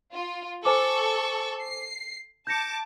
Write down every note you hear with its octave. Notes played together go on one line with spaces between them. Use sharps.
F4
A4 C5 G#5 C#6 D6
C7
A5 D6 G6 A#6 C#7